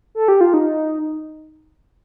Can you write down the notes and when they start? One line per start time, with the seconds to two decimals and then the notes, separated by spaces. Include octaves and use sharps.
0.15 A4
0.28 G4
0.41 F4
0.54 D#4